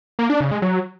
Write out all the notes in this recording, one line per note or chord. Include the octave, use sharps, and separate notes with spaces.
A#3
D4
C#3
G#3
F#3